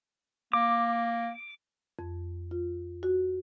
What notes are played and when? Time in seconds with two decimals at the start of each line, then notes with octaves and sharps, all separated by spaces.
0.53 A#3 D6
1.99 F2
2.51 F4
3.03 F#4